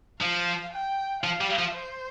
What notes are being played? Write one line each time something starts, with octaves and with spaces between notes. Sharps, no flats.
F3 F5
G5
F3 F5
G3
F3
C5